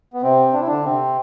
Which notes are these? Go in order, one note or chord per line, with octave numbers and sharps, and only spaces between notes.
B3
C3 C4
D4
E4
D3 D4
C3 C4